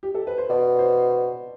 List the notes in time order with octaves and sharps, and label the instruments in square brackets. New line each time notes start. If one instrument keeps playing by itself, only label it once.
[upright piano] G4
A4
B4
C5
[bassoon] B2 [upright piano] D5
[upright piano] C5